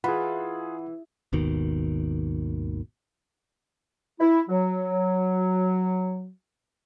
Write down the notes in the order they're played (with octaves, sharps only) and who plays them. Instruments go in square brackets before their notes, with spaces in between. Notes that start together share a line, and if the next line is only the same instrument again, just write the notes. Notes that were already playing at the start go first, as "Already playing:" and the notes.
[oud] E3 [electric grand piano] F4 G#4 [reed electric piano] F#5 B5
[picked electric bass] G#1 D#2 B2 D#3
[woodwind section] E4
F#3